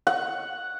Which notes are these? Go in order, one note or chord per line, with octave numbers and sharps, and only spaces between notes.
F#5